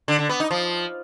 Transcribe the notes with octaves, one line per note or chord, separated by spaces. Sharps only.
D3
D3
B3
D#4
F3